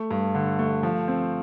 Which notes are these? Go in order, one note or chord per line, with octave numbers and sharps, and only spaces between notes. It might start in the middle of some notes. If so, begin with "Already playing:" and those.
Already playing: A3
G2
D3
A3
F3
C4